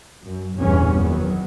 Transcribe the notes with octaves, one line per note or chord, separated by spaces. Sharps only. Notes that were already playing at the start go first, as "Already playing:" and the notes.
F#2
G1 E2 G2 A#2 G3 C#4
F#2 D#3 F#3 B3